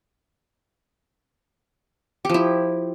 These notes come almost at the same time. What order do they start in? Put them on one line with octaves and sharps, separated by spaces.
G4 F3 E4